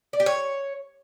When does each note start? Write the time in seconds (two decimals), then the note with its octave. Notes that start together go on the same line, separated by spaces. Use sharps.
0.13 D5
0.20 G4
0.26 C#5